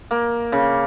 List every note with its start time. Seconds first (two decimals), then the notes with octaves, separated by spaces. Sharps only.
0.11 A#3
0.52 C#3